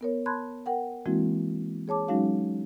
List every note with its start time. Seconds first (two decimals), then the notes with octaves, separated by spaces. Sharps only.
0.01 B3 A#4 C#5
0.26 A5 B5 C6 F#6 G#6
0.66 A#4 F#5 G5
1.06 E3 G#3 A#3 C4 E4 F#4
1.88 G#4 C#5 A5 D6
2.08 F#3 G#3 C#4 D#4 F#4 F5